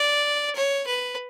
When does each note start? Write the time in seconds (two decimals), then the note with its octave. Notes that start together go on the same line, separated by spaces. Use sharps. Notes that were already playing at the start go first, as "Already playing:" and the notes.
Already playing: D5
0.55 C#5
0.87 B4